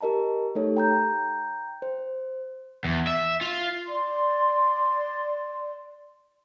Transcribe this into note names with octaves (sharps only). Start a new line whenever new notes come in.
G4 A#4 D#5 A5 A#5
A3 D#4 G4 A4 C#5
G5 A#5 G6
C5
E2
E5
F4
D5 C6